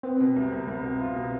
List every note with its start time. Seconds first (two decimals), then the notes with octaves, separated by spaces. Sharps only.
0.03 B3 C4
0.20 B2
0.36 C2
0.52 C2
0.68 C2
0.84 B2
1.00 F4
1.16 B2